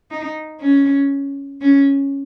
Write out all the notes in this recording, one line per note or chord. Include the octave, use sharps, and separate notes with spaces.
D#4
C#4
C#4